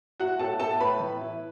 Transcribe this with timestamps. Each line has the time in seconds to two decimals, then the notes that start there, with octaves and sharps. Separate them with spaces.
0.20 E4 F#4 F#5
0.39 A2 A4 A5
0.60 E4 A4 A5
0.80 A2 B4 B5
1.00 E3
1.21 E4